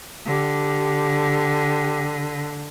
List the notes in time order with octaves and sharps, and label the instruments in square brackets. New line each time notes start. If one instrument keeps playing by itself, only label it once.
[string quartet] D3 [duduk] G4